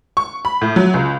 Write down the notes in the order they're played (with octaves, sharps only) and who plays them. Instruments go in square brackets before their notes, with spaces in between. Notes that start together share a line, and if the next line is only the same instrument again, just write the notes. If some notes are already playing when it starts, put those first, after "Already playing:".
[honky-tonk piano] C#6
B5
A2
F#3
C#2